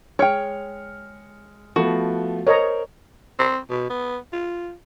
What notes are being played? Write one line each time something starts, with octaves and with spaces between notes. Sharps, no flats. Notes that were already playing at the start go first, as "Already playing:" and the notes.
G#3 C#5 G5 F6 C#7
F3 A3 B3 F#4
A#4 C5 C#5 D#5 A#5
C4
B2
B3
F4